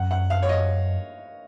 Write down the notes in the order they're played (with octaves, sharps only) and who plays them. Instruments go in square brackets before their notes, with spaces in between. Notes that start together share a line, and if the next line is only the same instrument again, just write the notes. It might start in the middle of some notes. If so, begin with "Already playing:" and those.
Already playing: [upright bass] F#2 [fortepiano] F#5
[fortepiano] F#5
F5
C#5
D#5